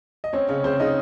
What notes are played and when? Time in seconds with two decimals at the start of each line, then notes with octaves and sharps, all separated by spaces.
0.24 D#5
0.33 C4 C#4 C#5
0.48 C#3 C#4 C#5
0.64 C#3 C4 C5
0.80 C#3 D#4 D#5